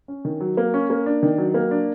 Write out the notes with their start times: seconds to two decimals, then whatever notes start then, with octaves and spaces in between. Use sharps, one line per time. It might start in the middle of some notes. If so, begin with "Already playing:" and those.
0.08 C#4
0.25 D#3
0.40 F#3
0.57 A#3
0.74 C#4
0.90 A#3
1.06 D4
1.23 D#3
1.38 F#3
1.54 A#3
1.71 D4